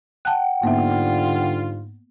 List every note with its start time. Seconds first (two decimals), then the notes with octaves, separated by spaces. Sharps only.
0.25 F#5 G5 A5 F#6
0.63 G#2 D3 G3 A#3 B3 F4 E5